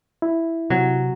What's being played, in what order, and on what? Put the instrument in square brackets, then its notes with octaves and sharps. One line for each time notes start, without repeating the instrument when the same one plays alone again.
[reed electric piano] E4
[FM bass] C3 [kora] F#3